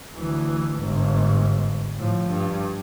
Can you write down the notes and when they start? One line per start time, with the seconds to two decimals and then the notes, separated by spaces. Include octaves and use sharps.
0.17 D2 E3
0.81 G1 G#2
1.97 A2 F3
2.30 G2